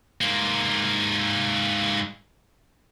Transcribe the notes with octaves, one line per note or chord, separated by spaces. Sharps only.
G#2 A#3